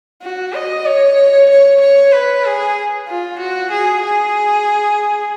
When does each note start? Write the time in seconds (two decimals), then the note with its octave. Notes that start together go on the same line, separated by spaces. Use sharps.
0.22 F#4
0.54 D#5
0.85 C#5
1.49 C#5
1.81 C#5
2.12 B4
2.45 G#4
3.08 F4
3.39 F#4
3.71 G#4
4.03 G#4